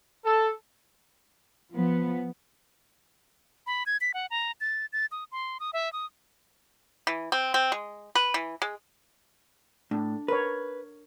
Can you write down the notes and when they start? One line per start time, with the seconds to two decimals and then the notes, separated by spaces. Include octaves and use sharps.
0.25 A4
1.72 F3 B3
3.67 B5
3.86 G#6
4.01 B6
4.14 F#5
4.30 A#5
4.61 A6
4.93 A6
5.12 D#6
5.32 C6
5.60 D#6
5.73 E5
5.93 D#6
7.07 E3
7.32 C4
7.54 C4
7.72 G#3
8.15 B4
8.34 E3
8.62 G#3
9.91 A2 D4
10.28 A#4 B4 C#5